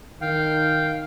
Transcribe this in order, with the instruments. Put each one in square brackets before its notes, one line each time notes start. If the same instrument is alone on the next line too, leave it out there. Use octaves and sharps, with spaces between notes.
[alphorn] D#3 [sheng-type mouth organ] F5 G5